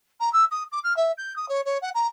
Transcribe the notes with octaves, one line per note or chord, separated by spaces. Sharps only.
A#5
E6
D#6
D6
F6
E5
G6
D#6
C#5
C#5
F#5
A#5